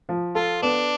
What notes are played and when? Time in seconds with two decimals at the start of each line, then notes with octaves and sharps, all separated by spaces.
0.09 F3
0.35 F4 A4
0.62 B3 D4